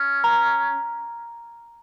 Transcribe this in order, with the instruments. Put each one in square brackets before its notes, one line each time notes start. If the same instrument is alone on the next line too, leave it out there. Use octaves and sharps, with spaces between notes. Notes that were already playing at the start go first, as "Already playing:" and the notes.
Already playing: [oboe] C#4
[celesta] A#5